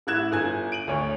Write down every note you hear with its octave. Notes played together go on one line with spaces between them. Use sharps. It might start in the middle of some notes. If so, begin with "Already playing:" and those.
A1 E4 F#6 G#6 E7
G1 G#5 G#6
D7 D#7 F#7
D2 C#5